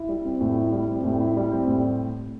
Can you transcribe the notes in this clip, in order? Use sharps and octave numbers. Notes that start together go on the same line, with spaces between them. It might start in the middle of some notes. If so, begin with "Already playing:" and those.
Already playing: E4
G3
C4
A2
E4
G3
C4
A2
E4
G3
C4
A2